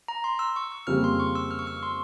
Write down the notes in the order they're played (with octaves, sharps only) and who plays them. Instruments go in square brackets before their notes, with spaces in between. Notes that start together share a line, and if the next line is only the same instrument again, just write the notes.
[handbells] A#5
C6
E6
C#6
E6
[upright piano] F2 C#3 G3 A#3 [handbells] F6
[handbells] C6
C#6
E6
F6
C#6
E6
C6